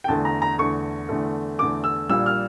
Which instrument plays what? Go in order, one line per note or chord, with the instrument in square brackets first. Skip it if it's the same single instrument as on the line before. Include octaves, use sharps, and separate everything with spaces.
[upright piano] G5
E2 D3 A3 A5
A#5
A#5
E2 D3 A3 C#6
E2 D3 A3
E2 D3 A3 D6
E6
A#1 A#2 G3 E6
F6